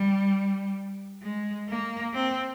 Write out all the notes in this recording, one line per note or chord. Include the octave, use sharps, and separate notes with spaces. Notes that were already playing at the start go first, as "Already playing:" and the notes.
Already playing: G3
G#3
A#3
C4